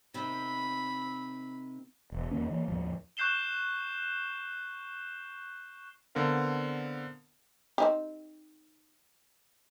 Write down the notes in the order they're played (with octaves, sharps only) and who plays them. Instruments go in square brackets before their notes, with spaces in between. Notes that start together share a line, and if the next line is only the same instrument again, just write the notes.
[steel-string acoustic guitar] C3 D#3 C4 [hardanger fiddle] B5
[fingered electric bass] E1
E2 D#3 A#3 C#4
E3 A#3
D#2 A2 F3
[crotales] C#6 F#6 G6 C7 E7 G7
[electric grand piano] D3 B3 C4 A#4 F5
[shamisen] C4 D#4 G4